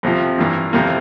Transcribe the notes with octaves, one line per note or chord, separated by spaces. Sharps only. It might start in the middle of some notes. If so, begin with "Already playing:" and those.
F2 C3 F3
G2 E3 A#3
F2 C3 G3 A#3